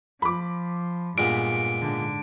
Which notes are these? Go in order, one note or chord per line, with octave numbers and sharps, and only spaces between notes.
F3 B5 D6
G2 A#2 G#3 B3 D7
G#2 D3